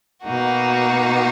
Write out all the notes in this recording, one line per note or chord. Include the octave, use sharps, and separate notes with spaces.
B2 A#3 D#4 F#4